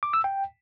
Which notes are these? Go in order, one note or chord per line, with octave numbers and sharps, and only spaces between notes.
D6
E6
G5